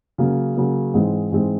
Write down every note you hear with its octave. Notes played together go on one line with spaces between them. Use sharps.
C#3 F#3 A#3
C#3 F#3 A#3
G#2 E3 G#3 C4
G#2 E3 G#3 C4